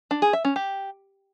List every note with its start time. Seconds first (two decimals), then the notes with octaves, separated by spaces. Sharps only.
0.11 D4
0.22 G#4
0.33 E5
0.45 C#4
0.56 G4